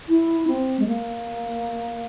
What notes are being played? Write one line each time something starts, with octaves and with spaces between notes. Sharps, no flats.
E4
C4
G#3
A#3